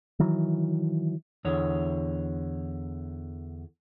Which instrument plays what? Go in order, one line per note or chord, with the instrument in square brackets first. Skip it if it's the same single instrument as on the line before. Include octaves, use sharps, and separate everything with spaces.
[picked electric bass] D#3 E3 F#3
[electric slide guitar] E2 D3 C#5